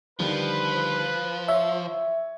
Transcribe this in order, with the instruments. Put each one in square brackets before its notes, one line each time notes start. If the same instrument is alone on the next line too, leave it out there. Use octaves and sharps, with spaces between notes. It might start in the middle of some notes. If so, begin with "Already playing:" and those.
[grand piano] D3 D#3 G3 [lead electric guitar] F3 [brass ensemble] B4
[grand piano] C#5 [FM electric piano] E5